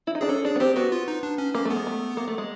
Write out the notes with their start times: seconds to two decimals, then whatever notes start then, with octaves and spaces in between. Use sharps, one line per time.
0.07 E4
0.15 D#4
0.21 D4 G#4
0.29 C#4 A4
0.45 D4 G#4
0.56 B3
0.60 C4 G4
0.76 B3 F#4
0.92 F4
1.08 D#4
1.23 D4
1.38 C#4
1.54 A#3 C#4
1.65 A3 B3
1.76 G#3
1.87 A3
2.17 A#3
2.28 A3
2.38 G#3